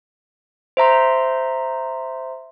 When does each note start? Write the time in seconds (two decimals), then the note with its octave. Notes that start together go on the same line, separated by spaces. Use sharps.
0.77 C5 E5 A#5 C6